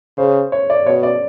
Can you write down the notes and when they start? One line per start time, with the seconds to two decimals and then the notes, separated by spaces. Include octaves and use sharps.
0.18 C#3 C5
0.52 C#5
0.70 D5
0.86 B2 C#5
1.03 D5